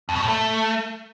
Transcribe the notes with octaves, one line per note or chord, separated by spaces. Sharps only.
F2
B2
A2
A3